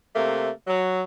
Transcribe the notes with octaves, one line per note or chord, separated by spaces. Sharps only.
C3 A3 A#3
F#3